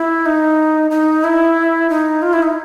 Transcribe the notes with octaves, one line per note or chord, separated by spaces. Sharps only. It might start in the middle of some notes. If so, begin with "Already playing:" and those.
Already playing: E4
D#4
D#4
E4
D#4
F4
E4
D#4